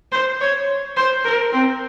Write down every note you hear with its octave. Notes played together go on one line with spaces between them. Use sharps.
C5
C#5
C5
A#4
C4